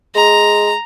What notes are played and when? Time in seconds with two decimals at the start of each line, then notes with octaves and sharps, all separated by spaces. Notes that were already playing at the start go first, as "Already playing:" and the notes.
0.15 G#3 A#5